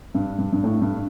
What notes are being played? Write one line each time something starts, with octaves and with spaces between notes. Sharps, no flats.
G2
G2
G2
A2
G2